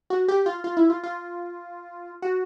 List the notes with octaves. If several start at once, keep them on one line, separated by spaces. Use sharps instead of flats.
F#4
G4
F4
F4
E4
F4
F4
F#4